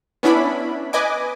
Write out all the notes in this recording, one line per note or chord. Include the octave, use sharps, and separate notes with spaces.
B3 C#4 D4 E4 B5
B4 D#5 G#5 D6